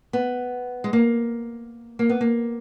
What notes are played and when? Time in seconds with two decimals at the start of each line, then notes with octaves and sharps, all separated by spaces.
0.13 B3
0.84 G#3
0.93 A#3
1.99 A#3
2.09 B3
2.21 A#3